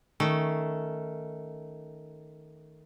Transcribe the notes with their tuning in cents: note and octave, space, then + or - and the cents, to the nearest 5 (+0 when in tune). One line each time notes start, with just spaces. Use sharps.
D#3 +5 A3 +0 C#4 +0